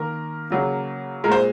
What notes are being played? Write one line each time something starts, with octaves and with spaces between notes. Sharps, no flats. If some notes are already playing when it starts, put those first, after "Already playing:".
Already playing: D#3 A#3 A#4
C#3 F#3 A#3
A#2 G#3 A#4 C5